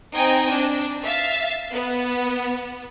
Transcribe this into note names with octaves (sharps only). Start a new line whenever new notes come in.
C4 D#4 D#5 G5 G#5
D4
E5 F5 A6
B3